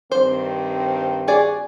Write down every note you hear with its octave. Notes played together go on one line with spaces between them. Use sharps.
G2 D#3 C4 C5
F#4 G#4 D5